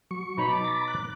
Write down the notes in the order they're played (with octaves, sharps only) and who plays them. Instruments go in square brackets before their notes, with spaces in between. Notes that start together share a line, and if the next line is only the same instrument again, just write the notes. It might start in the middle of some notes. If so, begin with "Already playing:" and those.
[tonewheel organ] F#3 C#6
[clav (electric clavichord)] B2 D#4 C#5 [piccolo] B5
[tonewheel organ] A5 [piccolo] D6
[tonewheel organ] A#5 B5 A6
F#6